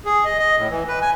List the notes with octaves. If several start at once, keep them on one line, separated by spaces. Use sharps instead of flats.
G#4
D#5
D#5
A2
E3
B4
G#5